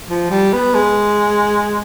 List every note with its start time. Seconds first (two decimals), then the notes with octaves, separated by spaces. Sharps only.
0.09 F3
0.31 G3
0.53 B3
0.74 G#3